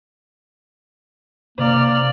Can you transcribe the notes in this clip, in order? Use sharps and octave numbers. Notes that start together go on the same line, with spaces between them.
C3 A#3 D5 F6